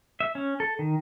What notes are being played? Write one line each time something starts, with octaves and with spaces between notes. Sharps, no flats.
E5
C#4
A4
D#3